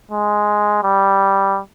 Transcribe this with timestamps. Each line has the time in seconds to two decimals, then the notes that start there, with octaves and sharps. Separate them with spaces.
0.12 G#3
0.84 G3